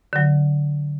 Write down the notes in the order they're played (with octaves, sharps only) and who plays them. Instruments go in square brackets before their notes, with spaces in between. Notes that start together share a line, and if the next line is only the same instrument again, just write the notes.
[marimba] D3 F#3